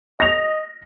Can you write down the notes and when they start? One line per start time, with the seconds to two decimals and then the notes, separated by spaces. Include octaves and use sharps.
0.20 D#5 A#6 F7